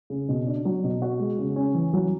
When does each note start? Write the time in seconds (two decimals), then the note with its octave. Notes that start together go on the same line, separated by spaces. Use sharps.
0.10 C#3
0.29 B2
0.47 D4
0.65 F#3
0.84 B2
1.02 F#4
1.20 G#3
1.39 C#3
1.56 C#4
1.75 E3
1.93 F#3